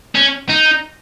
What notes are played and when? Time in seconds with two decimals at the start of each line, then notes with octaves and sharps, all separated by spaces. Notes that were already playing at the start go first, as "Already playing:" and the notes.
0.15 C#4
0.49 D#4